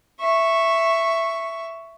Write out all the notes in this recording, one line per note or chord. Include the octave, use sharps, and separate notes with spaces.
E5 C#6